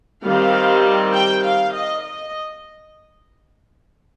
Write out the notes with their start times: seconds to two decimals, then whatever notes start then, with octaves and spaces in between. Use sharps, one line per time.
0.24 D#3 G3 C4 F5
1.14 G5
1.44 F5
1.73 D#5
2.03 D#5